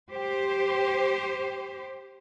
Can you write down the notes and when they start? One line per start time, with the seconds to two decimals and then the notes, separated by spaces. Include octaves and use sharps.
0.12 G4 C5